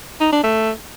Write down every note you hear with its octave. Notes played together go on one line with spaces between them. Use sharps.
D#4
D4
A3